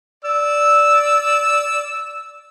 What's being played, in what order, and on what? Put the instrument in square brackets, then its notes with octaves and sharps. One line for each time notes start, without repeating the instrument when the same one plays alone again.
[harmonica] D5 E6